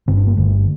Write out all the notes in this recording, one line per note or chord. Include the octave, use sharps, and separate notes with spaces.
G1 G2 D3 C4
D4
A#3
G1 G2 D3 A3